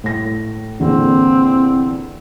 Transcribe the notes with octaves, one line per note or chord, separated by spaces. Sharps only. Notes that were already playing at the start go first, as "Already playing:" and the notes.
A2 A#6
E2 A#2 D3 C4